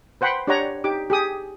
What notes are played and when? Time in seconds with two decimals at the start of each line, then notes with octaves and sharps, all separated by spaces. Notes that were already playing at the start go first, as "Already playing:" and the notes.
0.21 B4 C5 F#5 G5 B5 C6
0.47 D4 G4 C#5 D5 F#5 A#5
0.84 D#4 G4 D6
1.10 G4 G#4 D#6